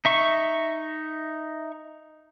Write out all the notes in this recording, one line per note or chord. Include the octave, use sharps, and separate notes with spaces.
D#4 E5 C#6